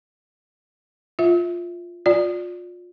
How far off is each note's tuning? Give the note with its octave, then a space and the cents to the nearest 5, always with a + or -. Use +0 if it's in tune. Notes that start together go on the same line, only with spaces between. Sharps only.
F4 +0 E5 -10
F4 +30 D5 +0